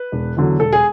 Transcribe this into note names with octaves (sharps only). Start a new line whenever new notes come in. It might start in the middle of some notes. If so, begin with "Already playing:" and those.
Already playing: B4
E1
E2 D3 F#3
E1 A4
G#4